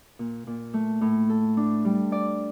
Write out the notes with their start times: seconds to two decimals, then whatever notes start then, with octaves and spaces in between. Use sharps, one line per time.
0.19 A#2
0.47 A#2
0.74 A3
1.01 A2
1.30 A4
1.57 D4
1.85 G3
2.12 D5